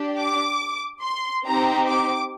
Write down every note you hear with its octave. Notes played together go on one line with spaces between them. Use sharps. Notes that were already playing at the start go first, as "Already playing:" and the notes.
Already playing: D4 G4
D6
C6
C4 D#4 G4 A#5
D6